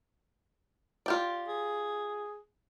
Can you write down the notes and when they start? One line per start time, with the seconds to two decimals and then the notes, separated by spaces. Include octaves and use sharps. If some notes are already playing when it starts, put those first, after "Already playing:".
1.06 F4 G4 D5
1.47 G#4